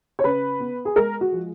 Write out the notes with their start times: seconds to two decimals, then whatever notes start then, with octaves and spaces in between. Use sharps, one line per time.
0.19 C#5
0.24 C#3 B4
0.60 B3
0.85 G#4
0.96 G#3 A#4
1.21 F#4
1.32 F3